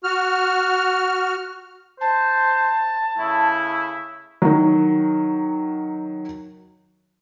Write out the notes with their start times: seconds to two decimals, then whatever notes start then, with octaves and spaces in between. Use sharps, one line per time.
0.04 F#4 F6
2.01 C5 A5
3.18 C#3 A3 E4
4.42 D#3 F#3